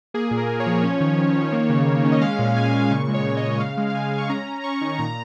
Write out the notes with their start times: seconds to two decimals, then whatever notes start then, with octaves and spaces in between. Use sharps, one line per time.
0.14 A#3 G#4
0.31 A#2
0.38 A#4
0.49 A#2
0.60 C#5
0.66 F3
0.84 C#4
1.01 D#3
1.18 D#3
1.35 D#3
1.52 A#3
1.69 C#3
1.87 A#3
2.04 C#4
2.12 D#5
2.21 G#3 F5
2.39 A#2
2.56 A#2 G#5
2.74 A#2
2.91 C#3 C#6
3.08 G#3
3.14 C#5
3.25 C#3
3.37 D#5
3.43 C#3
3.60 C#3 F5
3.77 G#3
3.90 F5
3.95 C#3 G#5
4.12 G#3
4.18 C#6
4.30 C#4 A#5
4.47 C#4
4.64 C#4 C#6
4.81 D#3
4.99 A#2 A#5